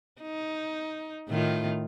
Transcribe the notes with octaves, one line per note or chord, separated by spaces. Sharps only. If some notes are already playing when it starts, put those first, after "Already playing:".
D#4
A2 D#3 F4